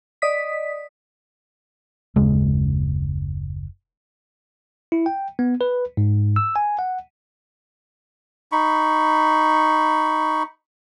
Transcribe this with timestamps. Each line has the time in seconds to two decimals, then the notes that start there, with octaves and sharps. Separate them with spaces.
0.22 D5 D#5 D#6 B6
2.16 F#1 D#2 C#3 G#3
4.92 E4
5.06 G5
5.39 B3
5.61 B4
5.97 G#2
6.36 E6
6.56 G#5
6.79 F#5
8.52 D#4 B5 C#6